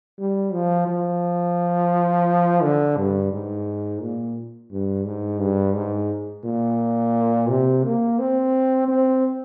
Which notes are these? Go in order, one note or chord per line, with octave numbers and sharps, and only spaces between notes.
G3
F3
F3
D3
G2
G#2
A#2
G2
G#2
G2
G#2
A#2
C3
A#3
C4
C4